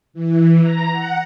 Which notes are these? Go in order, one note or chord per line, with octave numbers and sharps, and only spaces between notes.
E3
A#5
F#5